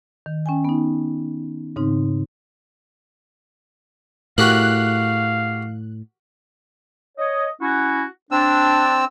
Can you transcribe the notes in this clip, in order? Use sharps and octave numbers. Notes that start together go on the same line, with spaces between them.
D#3
C#4 G5 G#5
B3 D#4
G#2 C#3 C4 D#4
A2 F#4 G4 A#4 F5 F#6
C#5 D#5
C#4 E4 F#4
C4 D4 E6